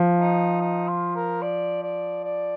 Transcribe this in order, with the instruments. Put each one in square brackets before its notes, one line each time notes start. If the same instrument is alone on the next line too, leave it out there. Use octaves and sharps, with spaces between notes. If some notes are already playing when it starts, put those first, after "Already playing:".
Already playing: [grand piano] F3
[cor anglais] D#4
D#4
F4
A#4
D5
D5
D5